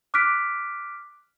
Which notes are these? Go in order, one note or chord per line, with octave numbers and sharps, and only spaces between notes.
D6 F6 F#6 B6 D7